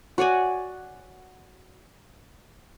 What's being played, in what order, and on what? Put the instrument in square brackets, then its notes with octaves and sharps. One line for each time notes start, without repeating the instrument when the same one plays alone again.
[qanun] F#4 C#5 D5 G#5